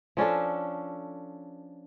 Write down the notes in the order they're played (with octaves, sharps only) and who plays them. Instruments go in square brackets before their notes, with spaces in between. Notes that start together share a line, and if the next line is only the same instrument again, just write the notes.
[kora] F3 C#4 D4 A4